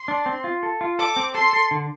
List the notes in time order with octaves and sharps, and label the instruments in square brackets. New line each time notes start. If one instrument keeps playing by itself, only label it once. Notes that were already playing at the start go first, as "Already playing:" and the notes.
Already playing: [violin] C6
[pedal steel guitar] D4
C4
F4
A4
F4
[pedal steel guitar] A4 [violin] D6
[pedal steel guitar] C4
[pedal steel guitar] A4 [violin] C6
[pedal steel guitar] A4
D3